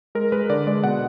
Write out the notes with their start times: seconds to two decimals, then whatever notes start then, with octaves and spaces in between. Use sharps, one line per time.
0.15 G#3 A#4
0.32 G#3 B4
0.50 D3 D5
0.67 G#3 D5
0.84 B2 F#5